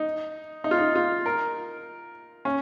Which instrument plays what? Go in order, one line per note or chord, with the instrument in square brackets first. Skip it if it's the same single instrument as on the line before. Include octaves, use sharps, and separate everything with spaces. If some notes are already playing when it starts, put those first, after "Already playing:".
Already playing: [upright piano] D#4
D#4
F4
D#4
F4
A#4
C#4